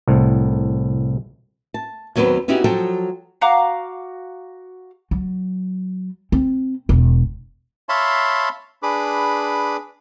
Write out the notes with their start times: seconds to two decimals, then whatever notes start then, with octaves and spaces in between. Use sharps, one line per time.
0.07 C2 A2
1.74 A5
2.16 D#2 F#3 B3 C4 B4
2.48 B3 C#4 D#4 E4 F#4 G4
2.64 F3 F#3 F#4 A4 G5
3.41 F#4 F5 A#5 D6
5.11 F#3
6.32 C4
6.89 E1
7.89 C#5 E5 F5 A5 B5 C6
8.83 D4 G#4 B4 B5 D6